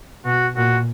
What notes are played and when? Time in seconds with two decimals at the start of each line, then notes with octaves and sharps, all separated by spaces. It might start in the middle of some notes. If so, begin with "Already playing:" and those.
0.25 B2 F#4
0.56 A#2 F#4